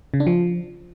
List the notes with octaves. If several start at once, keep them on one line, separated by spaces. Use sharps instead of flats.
C#3
D4
F3